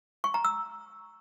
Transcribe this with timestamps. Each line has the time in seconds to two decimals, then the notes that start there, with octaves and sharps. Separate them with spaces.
0.24 C#6
0.34 A#5
0.44 E6